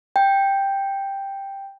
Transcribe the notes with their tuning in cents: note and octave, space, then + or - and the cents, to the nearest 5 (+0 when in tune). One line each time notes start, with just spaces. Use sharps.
G5 +5